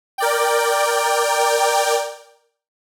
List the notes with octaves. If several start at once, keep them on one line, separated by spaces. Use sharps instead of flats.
A#4 D5 G5